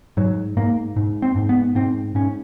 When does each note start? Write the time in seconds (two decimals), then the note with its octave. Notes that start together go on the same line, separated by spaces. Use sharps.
0.17 G#2 F#3
0.57 G#2 A#3
0.96 G#2
1.22 C4
1.36 G#2
1.49 B3
1.75 G#2 C4
2.15 G#2 C#4